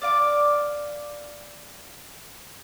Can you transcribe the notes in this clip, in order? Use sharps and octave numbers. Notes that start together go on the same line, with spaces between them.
D5 F5 D6